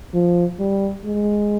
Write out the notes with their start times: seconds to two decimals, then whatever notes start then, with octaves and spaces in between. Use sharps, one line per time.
0.14 F3
0.60 G3
1.05 G#3